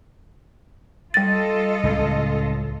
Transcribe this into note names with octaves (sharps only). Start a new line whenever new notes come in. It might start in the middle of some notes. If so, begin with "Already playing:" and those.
G3 F4 A4 D#5 A6
C#2 A2